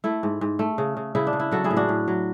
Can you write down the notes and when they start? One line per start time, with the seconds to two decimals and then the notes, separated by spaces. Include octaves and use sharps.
0.04 A3 E4
0.23 G#2
0.41 G#2
0.59 A3
0.78 C#3
0.97 C#3
1.15 C#3 E4
1.27 D4
1.33 C#3
1.40 E4
1.51 F#3 F#4 A4
1.64 E4 G#4
1.71 A2
1.77 D4 F#4
1.89 A2
2.08 F#3